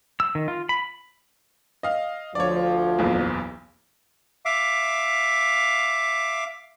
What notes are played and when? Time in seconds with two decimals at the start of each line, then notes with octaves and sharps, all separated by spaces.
0.20 E6
0.35 D#3
0.48 F4
0.69 B5
1.83 D#5 F5
2.35 D2 F3 C#5 D5
2.98 F#1 B1 E2
4.45 E5 F5 D6